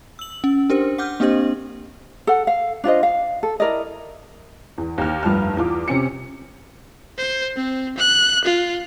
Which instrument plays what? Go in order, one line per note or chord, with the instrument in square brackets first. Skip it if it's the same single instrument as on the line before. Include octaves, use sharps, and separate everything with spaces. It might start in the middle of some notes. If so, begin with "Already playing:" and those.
[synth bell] E6 F#7
C#4
D4 G4 A#4 C5
F#5 D6 F6 G6
A#3 C4 D4 G4 C5 D#5
[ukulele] A4 F#5
F5
D4 F4 C5 D#5
F5
A4
E4 A#4 D5 D#5
[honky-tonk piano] E2
D#2 F6
F1 C2 G2 F3 A5 F6
E2 F4 D6
C3 C#4 C#7
[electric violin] C5
C4
F#6
F4